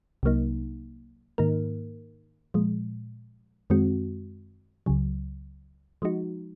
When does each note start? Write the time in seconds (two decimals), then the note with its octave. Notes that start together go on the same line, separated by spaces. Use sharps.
0.23 C2 C3 F#3 A#3 D#4
1.38 G#2 D#3 A#3 D#4 A#4
2.54 A#2 F3 G#3
3.70 F#2 D#3 G#3 C4 F#4
4.86 C#2 C#3 F#3
6.02 F3 G#3 D#4 F#4